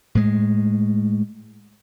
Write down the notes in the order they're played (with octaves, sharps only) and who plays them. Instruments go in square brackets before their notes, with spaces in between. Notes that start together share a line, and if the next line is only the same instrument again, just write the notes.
[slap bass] A2 G#3